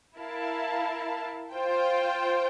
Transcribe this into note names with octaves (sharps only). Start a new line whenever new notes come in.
E4 A#4 F5 A5
F4 C5 G5